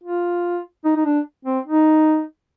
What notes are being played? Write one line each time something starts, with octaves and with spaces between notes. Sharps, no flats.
F4
D#4
D#4
D4
C4
D#4